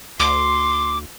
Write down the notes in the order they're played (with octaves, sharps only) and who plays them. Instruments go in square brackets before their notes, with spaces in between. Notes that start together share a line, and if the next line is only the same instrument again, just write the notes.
[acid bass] D2 [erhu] C6 [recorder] D6